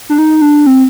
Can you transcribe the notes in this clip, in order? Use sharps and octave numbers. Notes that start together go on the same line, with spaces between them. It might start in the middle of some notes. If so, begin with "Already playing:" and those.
D4
D#4
D4
C4